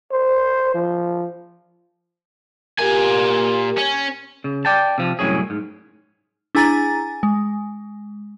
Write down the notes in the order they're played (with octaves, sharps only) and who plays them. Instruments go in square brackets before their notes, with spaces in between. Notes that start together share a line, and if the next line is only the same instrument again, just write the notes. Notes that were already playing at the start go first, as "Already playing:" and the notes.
[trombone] C5
F3
[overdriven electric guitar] A#2 G#5 [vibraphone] G4 A#4
[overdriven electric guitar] C#4
[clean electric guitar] C#3
D5 G5 A5
C3 F3
C2 F#2 A2 C#4 G#4
G#2
[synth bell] D4 E4 G#4 G#5 A#5 A6
G#3